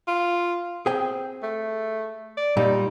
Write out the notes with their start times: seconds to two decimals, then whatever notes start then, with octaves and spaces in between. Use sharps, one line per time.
0.08 F4
0.86 C4 G#4 G5
1.43 A3
2.37 D5
2.57 A#2 G3 D#4